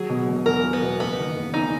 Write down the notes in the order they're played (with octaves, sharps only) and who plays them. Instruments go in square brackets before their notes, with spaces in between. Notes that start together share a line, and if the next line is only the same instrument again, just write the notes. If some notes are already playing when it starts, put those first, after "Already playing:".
Already playing: [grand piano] F#3 [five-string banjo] G#4
[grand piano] B2
E1
[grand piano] E2 [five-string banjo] A#4
[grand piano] F#3
[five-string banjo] B3
[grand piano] B2
[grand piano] F#1 [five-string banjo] B3
[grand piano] D#3
F#1
[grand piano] E2 [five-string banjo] D#4